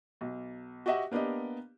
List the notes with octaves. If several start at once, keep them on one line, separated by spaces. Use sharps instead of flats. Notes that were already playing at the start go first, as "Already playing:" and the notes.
B1
F#4 G4 D#5 E5 F#5
A#3 B3 D4 G4 D#5